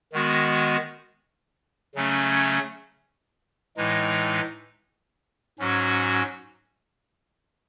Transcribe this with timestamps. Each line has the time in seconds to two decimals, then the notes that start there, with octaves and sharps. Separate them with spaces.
0.13 D#3 G#3 B3 F#4
1.95 C#3 F#3 A3 C#4
3.77 A2 E3 G#3 D#4
5.59 G#2 F#3 C#4 F#4